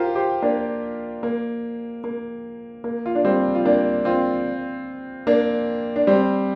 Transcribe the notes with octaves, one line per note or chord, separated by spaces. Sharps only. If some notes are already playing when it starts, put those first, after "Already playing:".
Already playing: F4 G4 A#4 C5
G4 C5
A#3 D4
A#3
A#3
A#3
F4
D4
G3 C4
F4
A#3 D4
C4 F4
A#3 D4
D4
G3 C4